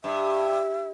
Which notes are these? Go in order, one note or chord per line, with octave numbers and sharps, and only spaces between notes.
G2 E5